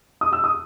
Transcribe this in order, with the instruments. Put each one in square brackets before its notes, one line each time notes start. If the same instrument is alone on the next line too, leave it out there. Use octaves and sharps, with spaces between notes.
[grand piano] D#6
E6
D#6